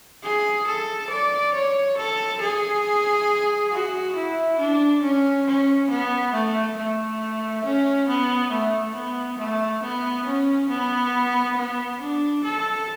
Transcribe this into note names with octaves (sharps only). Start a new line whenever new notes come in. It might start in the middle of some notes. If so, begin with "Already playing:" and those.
G#4
A4
D5
C#5
A4
G#4
F#4
E4
D4
C#4
C#4
B3
A3
A3
C#4
B3
A3
B3
A3
B3
C#4
B3
B3
D4
A4